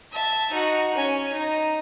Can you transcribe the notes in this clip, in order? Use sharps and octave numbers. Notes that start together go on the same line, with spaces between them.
E5 A5
D#4 F#4
C#4 G#5
D#4